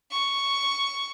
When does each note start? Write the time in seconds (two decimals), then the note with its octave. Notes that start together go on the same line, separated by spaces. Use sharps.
0.12 C#6